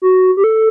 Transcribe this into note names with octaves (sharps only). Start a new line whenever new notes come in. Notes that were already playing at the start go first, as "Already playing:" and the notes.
F#4
G4
A4